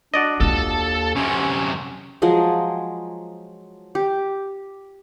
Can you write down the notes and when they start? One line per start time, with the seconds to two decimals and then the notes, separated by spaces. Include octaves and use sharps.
0.14 D4 F#4 D5 D#5
0.40 D#2 D4 F4 A4 A5
1.16 F#2 C3 C#4
2.22 F3 F#3 G#3 G#4
3.95 G4